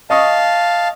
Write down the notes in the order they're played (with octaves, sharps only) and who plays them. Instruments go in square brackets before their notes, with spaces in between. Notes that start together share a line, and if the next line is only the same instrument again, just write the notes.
[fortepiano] D#5 C#6 D#6 [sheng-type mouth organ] F5 A5